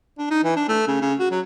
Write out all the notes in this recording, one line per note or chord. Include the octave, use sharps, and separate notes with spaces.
D4
D#4
E3
D4
A3
C#3
C#3
F#4
F#3